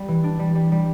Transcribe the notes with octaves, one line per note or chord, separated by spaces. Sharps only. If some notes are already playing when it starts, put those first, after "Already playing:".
Already playing: G3
E3
D4
G3
G3
G3